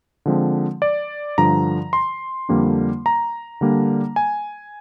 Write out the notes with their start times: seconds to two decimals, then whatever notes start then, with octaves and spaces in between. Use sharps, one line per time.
0.26 D3 F3 G#3 C4
0.82 D5
1.38 G2 D3 F3 A#5
1.93 C6
2.49 F2 D3 G3 A#3 D4
3.06 A#5
3.61 D3 G3 A#3 D4
4.16 G#5